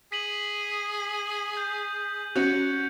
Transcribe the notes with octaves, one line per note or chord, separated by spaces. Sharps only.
G#4 B6 D#7 F#7
G6
C#4 F#4 G6 C#7